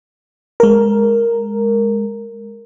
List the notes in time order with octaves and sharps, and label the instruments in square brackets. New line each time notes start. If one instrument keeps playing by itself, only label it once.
[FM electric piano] G#3 A#4